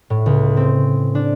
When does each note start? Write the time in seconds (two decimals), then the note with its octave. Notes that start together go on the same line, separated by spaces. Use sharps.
0.10 A2
0.26 C#2
0.57 C4
1.15 D4